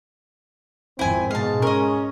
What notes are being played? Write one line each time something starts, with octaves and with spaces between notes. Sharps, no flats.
G#1 F2 C4 E4 G#5
G#2 B2 G#3 F5 A5
C#4 A#4 D#5